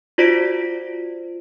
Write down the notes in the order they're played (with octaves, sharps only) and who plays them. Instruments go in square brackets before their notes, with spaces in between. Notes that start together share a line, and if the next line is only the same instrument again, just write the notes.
[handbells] F4 F#4 C5 D5 B6 D7